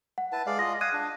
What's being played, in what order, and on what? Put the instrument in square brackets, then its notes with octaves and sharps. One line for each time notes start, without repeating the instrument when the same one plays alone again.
[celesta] F#5
[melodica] E4 B4 A5
G#3 D5 F5
[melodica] F4 D#5 [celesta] F5 A#6
[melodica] F5 D#6 [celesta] F#6 G#6 D#7
[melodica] D4